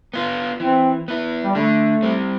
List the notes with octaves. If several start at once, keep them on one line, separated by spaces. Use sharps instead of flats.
B3 F4
E3 C4
B3 E4
G3
D3 A3
G3 C4